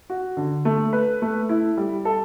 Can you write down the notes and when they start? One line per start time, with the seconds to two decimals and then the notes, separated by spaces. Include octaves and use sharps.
0.10 F#4
0.37 D3
0.65 A3
0.93 B4
1.22 A3
1.49 E4
1.77 G3
2.05 A4